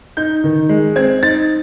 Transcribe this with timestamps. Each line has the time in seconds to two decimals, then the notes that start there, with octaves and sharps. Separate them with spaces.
0.17 D#4 G6
0.44 D#3
0.69 G#3
0.96 C4 G#6
1.23 D#4 A6